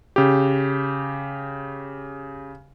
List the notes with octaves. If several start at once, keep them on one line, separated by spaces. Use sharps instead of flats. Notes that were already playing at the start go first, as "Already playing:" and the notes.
C#3 G4